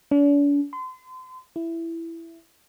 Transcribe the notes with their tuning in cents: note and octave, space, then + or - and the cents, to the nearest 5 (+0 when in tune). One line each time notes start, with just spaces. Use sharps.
D4 -45
C6 -35
E4 +10